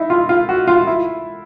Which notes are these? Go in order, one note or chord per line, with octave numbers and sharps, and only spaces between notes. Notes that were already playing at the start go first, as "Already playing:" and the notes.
Already playing: D#4 E4
F4
F4
F#4
F4
E4